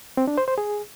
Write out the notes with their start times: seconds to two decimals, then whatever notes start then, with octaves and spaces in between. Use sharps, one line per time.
0.17 C4
0.28 D4
0.38 C5
0.48 C5
0.58 G#4